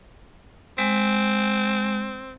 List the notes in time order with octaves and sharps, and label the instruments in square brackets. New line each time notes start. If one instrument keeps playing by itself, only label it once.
[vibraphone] G#3 [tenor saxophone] C4